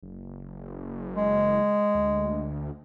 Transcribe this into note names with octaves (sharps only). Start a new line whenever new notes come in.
F#1
G#3
D2